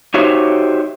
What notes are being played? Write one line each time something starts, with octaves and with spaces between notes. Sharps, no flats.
D#4 F#4 G4 C5 C#5 E5